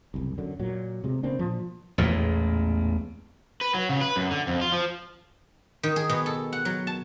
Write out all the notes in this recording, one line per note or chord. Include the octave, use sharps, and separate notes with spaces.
F#1 C2
F#2 D3
A#2 F#3
C3 G#3
C#3 A#3 C4 D4
A#2 F3
A1 E2 A#2 G#3
B4
F#3
C#3
B4
F#2
D3
F2
F4
F3
D#3
G#4
B2
A4
F#5
F#3
A5